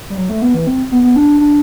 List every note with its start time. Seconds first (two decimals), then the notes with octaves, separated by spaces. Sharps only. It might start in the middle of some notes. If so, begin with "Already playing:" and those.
0.10 G3
0.18 F#3
0.29 A3
0.42 B3
0.54 E3
0.67 C4
0.91 B3
1.03 B3
1.16 D4
1.40 D4